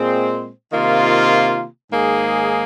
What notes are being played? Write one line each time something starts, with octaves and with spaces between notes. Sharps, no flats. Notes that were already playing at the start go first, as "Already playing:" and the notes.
Already playing: A#2 G#3 C4 G#4 C5
C3 D#3 A#3 F4
G#2 D#3 A#3 G#4